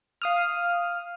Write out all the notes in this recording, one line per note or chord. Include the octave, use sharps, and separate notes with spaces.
F5 D#6 F6